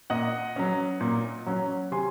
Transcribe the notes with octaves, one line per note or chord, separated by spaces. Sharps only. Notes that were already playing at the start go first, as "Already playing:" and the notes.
A#2 D#5 F#5
F#3 C#4
A#2
F#3 C#4
C3 G#5 C6